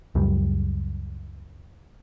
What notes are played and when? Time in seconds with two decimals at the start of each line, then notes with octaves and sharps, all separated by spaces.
0.15 C#2 F#2 G3